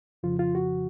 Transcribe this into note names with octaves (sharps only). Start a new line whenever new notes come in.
F2 C#3 F3 F4
F4
F#4